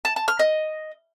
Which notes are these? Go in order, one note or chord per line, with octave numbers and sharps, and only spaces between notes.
A5
A5
F6
D#5